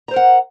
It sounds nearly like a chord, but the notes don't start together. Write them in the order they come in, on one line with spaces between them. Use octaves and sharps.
A#5 C5 A#4 F#5